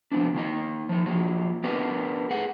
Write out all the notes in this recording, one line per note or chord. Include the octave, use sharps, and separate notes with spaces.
F3 B3 C4 D4
D#3 A#3 D#4 D#5
F3 D#4
F3 F#3 A#3 F4
B3 D4 G4 A#4 B4
A3 G#4 A4 F#5